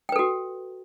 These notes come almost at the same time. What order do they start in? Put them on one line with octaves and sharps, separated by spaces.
G5 B4 A4 F#4